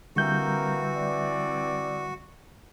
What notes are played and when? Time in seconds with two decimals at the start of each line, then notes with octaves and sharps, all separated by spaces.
0.16 D3 E3 G3 A#3 C4 F#4 A#4 G6
0.96 D5